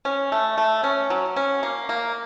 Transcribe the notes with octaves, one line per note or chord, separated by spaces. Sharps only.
C#4
A3
A3
C#4
F#3
C#4
A#3
A#3